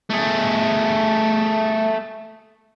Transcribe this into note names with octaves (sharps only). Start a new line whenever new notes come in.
A3 G#4